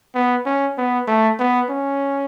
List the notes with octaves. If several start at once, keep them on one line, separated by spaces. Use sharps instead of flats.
B3
C#4
B3
A3
B3
C#4